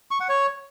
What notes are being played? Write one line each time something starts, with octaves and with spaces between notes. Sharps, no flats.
C#6
F#5
C#5